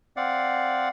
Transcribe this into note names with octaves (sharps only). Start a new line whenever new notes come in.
C4 D5 F5 F#5